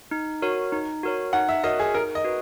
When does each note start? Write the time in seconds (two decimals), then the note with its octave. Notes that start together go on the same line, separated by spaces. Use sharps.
0.11 D#4
0.42 F#4 A#4 C#5
0.72 D#4
1.03 F#4 A#4 C#5
1.33 D#4 F#5
1.49 E5
1.64 F#4 A#4 C#5 D#5
1.79 G#4
1.94 D#4 A#4
2.15 D#5
2.24 F#4 B4